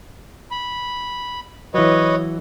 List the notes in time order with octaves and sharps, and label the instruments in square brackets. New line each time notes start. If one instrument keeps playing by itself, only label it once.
[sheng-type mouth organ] B5
[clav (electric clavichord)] E3 F#3 [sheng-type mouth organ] B4 C#5 D#5